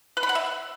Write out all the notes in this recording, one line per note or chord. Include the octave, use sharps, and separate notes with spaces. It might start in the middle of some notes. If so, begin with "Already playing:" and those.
B4
B5
F#5
E5